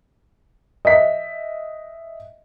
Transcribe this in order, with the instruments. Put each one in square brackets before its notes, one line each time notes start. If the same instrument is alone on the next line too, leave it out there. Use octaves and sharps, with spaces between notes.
[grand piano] D#5 E5 B6